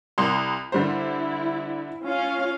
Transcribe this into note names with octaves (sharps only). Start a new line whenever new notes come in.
C2 C6
D3 G3 E4 C5
C#4 F4 F5